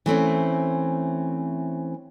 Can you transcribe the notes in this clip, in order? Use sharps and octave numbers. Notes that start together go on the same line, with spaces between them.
E3 A3 C4 C#4